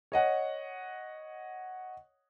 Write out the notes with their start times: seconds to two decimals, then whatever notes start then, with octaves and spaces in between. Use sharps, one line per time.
0.12 C#5 D#5 F#5